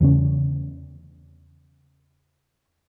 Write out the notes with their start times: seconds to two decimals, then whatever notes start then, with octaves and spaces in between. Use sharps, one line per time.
0.01 E2 C#3 C#4